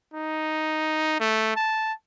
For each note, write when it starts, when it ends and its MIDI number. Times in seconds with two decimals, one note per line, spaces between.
0.14 1.17 63
1.20 1.51 57
1.56 1.93 81